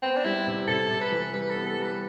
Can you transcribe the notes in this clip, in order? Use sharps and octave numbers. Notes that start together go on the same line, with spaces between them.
B3 C4
D4
G3 E4
C3
C3 A4
C3
B4
E3
G3 B4
A4
B3
A4
G3
B4